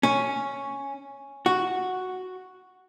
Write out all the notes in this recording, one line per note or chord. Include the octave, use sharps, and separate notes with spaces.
C#4
F#4